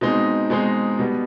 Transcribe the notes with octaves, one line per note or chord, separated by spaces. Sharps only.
B2 G#3 C4 D#4
B2 G#3 C4 D#4
B2 G3 B3